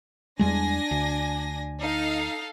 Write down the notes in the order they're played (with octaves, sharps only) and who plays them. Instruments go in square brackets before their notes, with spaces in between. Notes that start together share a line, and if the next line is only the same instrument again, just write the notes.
[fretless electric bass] E2 G3 G#3 [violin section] D4 G#5 A#6
[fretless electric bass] D2
[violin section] D#4 A4 F5